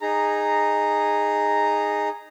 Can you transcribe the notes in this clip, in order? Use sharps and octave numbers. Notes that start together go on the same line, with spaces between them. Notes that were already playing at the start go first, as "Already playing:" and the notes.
D#4 G#4 A#5